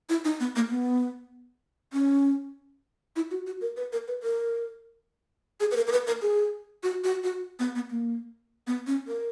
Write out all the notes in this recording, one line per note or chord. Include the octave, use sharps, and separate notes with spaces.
E4
D#4
B3
A#3
B3
C#4
E4
F#4
F#4
A#4
B4
A#4
B4
A#4
G#4
B4
A#4
A#4
B4
A#4
G#4
F#4
F#4
F#4
B3
B3
A#3
B3
C#4
A#4